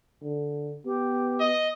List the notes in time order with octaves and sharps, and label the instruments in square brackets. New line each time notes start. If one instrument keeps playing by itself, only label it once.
[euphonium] D3
[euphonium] B3 [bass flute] G4
[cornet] D#5